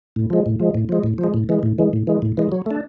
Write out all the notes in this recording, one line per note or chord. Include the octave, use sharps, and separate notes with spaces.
A2
F3 G#3
A2
F3 G#3
A2
F3 G#3
A2
F3
G#3
A2
E3 G#3
A2
E3 G#3
A2
E3 G#3
A2
E3 G#3
F#3
A3 D4